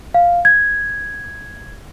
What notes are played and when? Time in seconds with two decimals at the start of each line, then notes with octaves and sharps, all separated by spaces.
0.14 F5
0.45 G#6